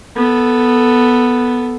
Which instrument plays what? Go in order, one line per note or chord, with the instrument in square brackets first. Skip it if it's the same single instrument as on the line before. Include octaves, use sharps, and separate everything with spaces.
[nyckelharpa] B3 A4